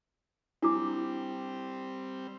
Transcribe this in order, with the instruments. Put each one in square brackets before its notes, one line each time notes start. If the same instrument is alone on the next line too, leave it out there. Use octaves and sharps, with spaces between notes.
[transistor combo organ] G3 C4 [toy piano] D4 E4 D6